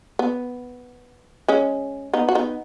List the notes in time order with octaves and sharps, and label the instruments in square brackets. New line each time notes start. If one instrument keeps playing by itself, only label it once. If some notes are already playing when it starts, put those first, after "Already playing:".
[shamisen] B3
G#3 C#4
B3 D#4
F#4
B3 D#4